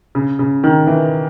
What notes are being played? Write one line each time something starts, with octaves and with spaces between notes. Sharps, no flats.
C#3
C#3
D#3
E3